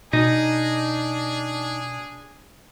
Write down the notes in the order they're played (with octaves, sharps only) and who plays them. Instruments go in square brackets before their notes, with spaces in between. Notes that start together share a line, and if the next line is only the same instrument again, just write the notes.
[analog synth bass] B2 [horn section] D4 G#4 [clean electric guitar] D#4